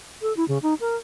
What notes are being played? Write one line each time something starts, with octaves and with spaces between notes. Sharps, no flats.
A4
E4
C#3
D#4
A#4